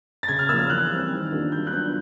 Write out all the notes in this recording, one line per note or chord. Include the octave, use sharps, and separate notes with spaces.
A6
C#3 G#6
F6
F3 A#3 E6
F6
E3 F#6
G3 C4
D#3
G3 A#3 D4 F4
F#3 G6
F#6
B3 D4 F4 G6